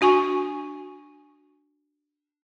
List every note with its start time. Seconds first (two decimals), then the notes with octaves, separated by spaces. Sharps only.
0.01 D4 F#4 G#5 C#6